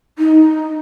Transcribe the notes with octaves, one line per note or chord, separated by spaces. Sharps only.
D#4